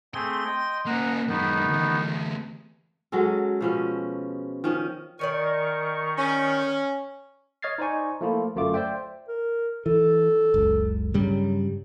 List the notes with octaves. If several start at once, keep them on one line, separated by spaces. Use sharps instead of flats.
A3 C4 G#4 C6
D#5 G5
A#3 C#4 D#5 F#5 A#5
F#2 D#3 G#3 B3 D#4
D2 E3
F#3 G#3 C#4 A4
B2 F3 C#4
D#3 F3 C#4
D#3 A#4 D5 D#5 G#5 C#6
C#4
C#5 D#5 F6 G#6 A6 C7
D#4 C5 D5 G#5 C#6
F3 A3 A#3 E4 F4
G1 F#2 A3 F4 D6
C5 D5 E5 G5
A#4
E3 A4
F#1 C#2
G2 C#3 F#3 G3